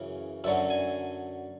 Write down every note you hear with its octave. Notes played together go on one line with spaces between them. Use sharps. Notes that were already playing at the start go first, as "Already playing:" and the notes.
Already playing: F#2 C#3 E3
F#2 D3 F#3 E5
G#5